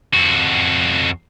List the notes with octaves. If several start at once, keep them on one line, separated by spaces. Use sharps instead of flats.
F2 F#4